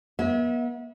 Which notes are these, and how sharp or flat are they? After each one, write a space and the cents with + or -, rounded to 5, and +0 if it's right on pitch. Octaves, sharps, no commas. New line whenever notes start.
B3 -40 E5 -30